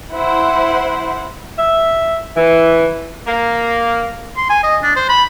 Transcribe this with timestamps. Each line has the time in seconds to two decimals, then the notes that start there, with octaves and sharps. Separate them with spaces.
0.12 E4 C5 F#5
1.57 E5
2.36 E3
3.27 A#3
4.37 C6
4.50 G#5
4.63 D#5
4.83 D4
4.96 C5
5.09 B5